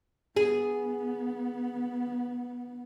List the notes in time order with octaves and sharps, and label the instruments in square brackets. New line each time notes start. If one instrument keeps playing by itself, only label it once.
[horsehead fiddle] B3 [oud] G#4